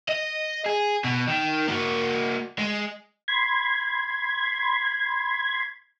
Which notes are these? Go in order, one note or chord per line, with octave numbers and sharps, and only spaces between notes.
D#5
G#4
B2
D#3
A#3 F#4
G#3
B5 C6 G#6